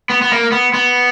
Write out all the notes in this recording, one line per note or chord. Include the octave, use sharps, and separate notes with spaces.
B3
B3
A#3
B3
B3